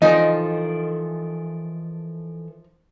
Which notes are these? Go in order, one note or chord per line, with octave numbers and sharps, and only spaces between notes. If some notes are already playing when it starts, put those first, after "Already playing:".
E3 F3 D#4 A4 A#4 D#5 G#5